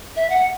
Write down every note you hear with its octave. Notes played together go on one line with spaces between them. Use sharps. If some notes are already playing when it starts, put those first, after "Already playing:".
E5
F#5